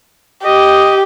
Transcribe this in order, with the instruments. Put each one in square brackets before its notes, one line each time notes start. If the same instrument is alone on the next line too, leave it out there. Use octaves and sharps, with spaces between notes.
[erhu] G4 [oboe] D#5